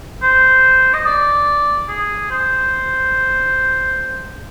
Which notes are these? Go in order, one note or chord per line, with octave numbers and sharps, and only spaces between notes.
C5
D#5
D5
G#4
C5